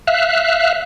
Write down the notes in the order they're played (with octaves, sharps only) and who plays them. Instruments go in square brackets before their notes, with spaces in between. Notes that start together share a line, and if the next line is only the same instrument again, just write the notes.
[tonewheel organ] E5 F5 F#6